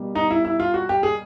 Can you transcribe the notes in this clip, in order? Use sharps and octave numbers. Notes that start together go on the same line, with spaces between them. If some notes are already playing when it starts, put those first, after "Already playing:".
Already playing: B2 G3 A#3
D#4
E4
E4
F4
F#4
G4
G#4